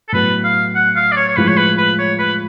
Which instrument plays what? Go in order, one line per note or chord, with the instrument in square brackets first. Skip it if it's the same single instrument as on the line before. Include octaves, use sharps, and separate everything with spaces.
[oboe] A4
[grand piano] A2 F#3 B3 [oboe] B4
[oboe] F5
F#5
F5
D5
C#5
C#5
[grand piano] A2 F3 G#3 [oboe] B4
[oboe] C#5
B4
B4
C#5
B4